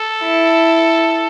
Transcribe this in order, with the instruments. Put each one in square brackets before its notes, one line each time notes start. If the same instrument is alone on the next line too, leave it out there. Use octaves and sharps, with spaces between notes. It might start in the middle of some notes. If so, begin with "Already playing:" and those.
Already playing: [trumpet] A4
[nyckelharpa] E4